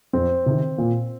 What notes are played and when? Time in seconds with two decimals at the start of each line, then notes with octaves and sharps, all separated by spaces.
0.13 F2 C4
0.46 C3 D#3
0.78 A#2